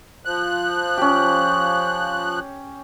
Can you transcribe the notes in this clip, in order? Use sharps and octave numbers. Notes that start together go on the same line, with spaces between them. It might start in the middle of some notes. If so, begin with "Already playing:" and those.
F3 F#6
C#4 G4